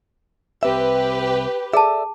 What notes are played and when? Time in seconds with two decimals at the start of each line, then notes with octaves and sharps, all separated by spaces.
0.63 C2 C4 G4 B4 E5
1.74 G#4 A4 D5 E5 A5